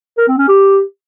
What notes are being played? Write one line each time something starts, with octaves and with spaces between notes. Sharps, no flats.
A#4
C4
C#4
G4